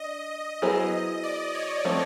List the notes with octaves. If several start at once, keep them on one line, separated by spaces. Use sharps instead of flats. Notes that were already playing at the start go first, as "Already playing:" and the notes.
Already playing: D4 D#5
F#3 B3 E4 G#4 C5
D5
C#5
F3 A3 C4